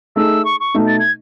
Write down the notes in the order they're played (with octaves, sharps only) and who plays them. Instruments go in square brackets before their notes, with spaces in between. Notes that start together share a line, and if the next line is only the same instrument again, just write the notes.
[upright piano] A3 D#4 G#4 [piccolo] E6
[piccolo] C#6
C#6
[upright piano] B2 A3 D#4
[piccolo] A6
G#6